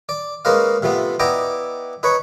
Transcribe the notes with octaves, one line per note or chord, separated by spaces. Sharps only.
D5
G#3 A#3 C#4 B4 D#5 F5
C3 F3 A3 B3
B3 E4 D5 D#5 G5 A#5
D#4 B4 C#5 B5 C#6